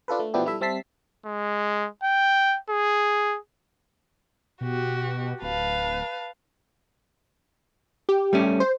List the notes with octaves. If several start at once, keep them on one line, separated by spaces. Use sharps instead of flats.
D4 F4 A4 B4
A3
B2 F3 B3 D4 E4 G4
G3 E4 A4 E5
G3 C4 E5 A5 B6 C7
G#3
G5
G#4
B2 F#4 G4
D1 B4 F5 A5
G4
G3 A3 C#4
C5